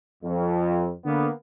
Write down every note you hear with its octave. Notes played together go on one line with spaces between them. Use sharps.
F2
D3 A#3 B3